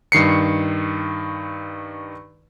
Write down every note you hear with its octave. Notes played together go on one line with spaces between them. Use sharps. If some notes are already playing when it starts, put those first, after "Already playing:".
G2 D#3 C7 C#7